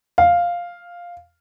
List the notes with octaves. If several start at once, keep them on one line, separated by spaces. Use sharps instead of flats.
F5